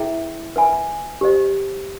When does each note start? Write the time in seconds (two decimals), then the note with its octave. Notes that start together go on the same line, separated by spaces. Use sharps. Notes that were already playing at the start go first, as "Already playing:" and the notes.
Already playing: E4 G#4 B4 E5 G5
0.56 B4 E5 G#5 B5
1.21 G4 C5 D#5